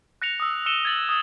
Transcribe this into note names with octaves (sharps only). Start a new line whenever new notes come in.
F#6 A#6 C#7 F7
D#6 E6
E6 C#7 D#7 E7 G7
G#6 A6 F#7
D#6